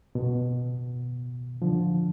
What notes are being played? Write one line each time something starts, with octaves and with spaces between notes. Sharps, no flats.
B2
D3 F3